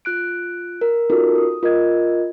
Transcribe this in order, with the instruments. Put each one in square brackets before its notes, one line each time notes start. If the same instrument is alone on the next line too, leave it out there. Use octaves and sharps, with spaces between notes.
[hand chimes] F4 F#6 D7
A#4
C#4 D#4 F4 F#4 A4 A#4
D#6
F4 A#4 D#5 G#6